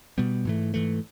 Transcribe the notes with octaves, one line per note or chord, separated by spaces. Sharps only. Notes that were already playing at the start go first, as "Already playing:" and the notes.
B2 G3 B3
G#2 E3 A3
G#2 E3 A3